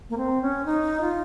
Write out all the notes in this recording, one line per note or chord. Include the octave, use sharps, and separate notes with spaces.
A#3
C4
C#4
D#4
F4